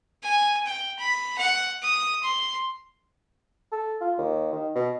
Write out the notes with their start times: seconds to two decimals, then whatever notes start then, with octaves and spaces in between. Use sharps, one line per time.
0.23 G#5
0.66 G5
0.99 B5
1.38 F#5
1.83 D#6
2.23 C6
3.72 A4
4.01 F4
4.18 D#2
4.53 D#3
4.75 B2